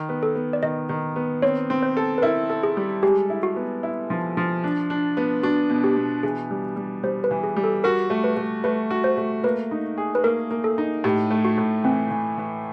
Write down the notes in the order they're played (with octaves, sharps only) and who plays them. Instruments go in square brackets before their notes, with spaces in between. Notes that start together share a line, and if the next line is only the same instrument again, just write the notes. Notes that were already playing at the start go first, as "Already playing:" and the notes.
Already playing: [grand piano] D#3
B3
[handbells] A4
[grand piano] B3
[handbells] D5
[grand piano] D#3 [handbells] D#5
[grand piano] D#3
B3
[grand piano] C4 [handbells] C#5
[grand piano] C4
[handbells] C5
[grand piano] A4
[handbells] B4
[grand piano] E4 [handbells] A#4
[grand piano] A4
[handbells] G#4
[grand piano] G3
[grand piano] G#3 [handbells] G4
[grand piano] E4
[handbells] F#4
[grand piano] B3
E4
F3
F3
D4
D4
B3
[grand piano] D4 [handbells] F#4
[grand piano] B2
[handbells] G4
[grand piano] B2
[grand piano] E3 [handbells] G#4
[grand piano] G3
G3
[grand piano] G3 [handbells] C5
[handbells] B4
[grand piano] E3
[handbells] G#4
[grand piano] G3
[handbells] A4
[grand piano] F#4 [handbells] A#4
[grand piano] A3
[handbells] B4
[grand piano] A3
[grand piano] A3 [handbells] B4
[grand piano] F#4
[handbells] C5
[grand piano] A3
[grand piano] A#3 [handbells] B4
[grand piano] D#4
G#4
[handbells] B4
[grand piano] A#3 [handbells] A#4
[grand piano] A#3
[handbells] A4
[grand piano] D#4
[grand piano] A2 [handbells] G4
[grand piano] A3
[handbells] F#4
[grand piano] A2
[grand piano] E3 [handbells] C4
[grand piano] E3
E3